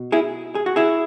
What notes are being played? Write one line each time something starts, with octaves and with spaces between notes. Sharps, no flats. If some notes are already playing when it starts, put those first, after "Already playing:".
Already playing: B2
E4 G#4
G#4
F#4
E4 G#4